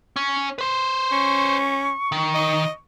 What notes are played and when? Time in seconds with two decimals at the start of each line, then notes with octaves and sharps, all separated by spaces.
0.16 C#4
0.58 B4 C5
1.12 C#4 C#6
2.12 D#3
2.35 D#5